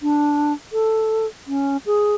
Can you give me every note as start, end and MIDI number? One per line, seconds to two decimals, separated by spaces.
0.02 0.53 62
0.73 1.26 69
1.47 1.77 61
1.86 2.16 68